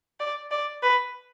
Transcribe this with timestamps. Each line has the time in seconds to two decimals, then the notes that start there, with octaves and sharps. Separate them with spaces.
0.20 D5
0.51 D5
0.82 B4